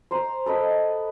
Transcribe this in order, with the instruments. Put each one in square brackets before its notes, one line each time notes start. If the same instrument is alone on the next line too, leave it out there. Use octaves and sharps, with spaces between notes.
[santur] C5 A#5 C6
A4 B4 D#5 B5